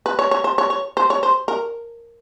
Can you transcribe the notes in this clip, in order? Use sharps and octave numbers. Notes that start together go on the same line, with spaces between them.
B4
C#5
C#5
C5
C#5
C#5
C5
C#5
C5
A#4